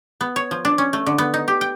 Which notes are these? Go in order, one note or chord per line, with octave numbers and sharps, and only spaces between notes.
B3
C#5
F3
D4
C#4
A3
D3
B3
D#4
G4
G5